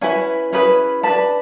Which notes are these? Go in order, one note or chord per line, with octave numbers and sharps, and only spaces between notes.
C#4 E4 B4 G#5
C#4 E4 G#4 B4
D4 G#4 B4 A5